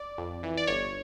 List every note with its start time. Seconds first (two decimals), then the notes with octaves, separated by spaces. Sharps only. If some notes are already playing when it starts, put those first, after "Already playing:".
Already playing: D5
0.18 F2
0.43 E3
0.57 D5
0.67 G1 C#5